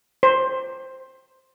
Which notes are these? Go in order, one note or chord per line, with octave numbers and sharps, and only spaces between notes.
C5